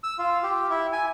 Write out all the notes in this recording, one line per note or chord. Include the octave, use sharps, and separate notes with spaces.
E6
F4
G4
E4
G#5